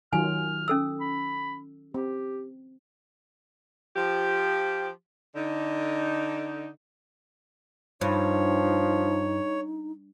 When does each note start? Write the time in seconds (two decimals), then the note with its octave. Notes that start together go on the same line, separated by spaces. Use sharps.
0.13 D#3 F#3 F4 G#5 F6
0.68 C#4 A4 E6
1.01 B5
1.94 C4 G4
3.96 F3 G4
5.36 D3 D#4
8.01 G2 F3 D#4 C#5